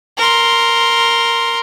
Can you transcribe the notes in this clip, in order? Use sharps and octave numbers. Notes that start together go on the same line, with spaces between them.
A#4 C6